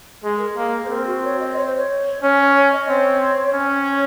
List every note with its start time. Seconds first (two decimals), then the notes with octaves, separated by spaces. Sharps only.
0.23 G#3 G#4
0.38 A#4
0.51 G#4
0.57 A#3
0.85 C5
0.90 C4 A#4
1.06 F#4
1.24 C#5
1.40 D#5
1.57 C#5
1.67 C5
1.76 C#5
2.22 C#4 C#5
2.39 C#5
2.56 C#5
2.72 D#5
2.88 C4 C#5
3.54 C#4 C#5